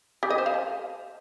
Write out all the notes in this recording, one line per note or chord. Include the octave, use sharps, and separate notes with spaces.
G4
D#5
C5
F5
A5